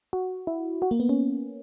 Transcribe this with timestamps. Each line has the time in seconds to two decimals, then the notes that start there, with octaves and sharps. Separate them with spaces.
0.13 F#4
0.47 E4
0.82 F#4
0.91 A#3
1.00 B3
1.09 C#4